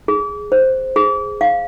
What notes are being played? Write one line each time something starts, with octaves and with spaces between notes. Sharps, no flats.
G#4
C5
G#4
F5